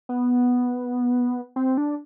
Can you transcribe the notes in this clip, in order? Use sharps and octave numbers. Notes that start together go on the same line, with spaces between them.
B3
C4
D4